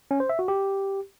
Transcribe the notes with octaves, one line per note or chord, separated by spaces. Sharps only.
C#4
C5
E5
F#4
G4